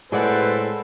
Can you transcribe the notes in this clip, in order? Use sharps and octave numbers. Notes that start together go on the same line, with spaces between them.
A2 G#3 C4 A4 B4 D5 F#5